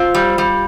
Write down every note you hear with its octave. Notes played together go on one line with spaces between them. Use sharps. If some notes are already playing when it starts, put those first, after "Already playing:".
Already playing: C4 F4
G3
G3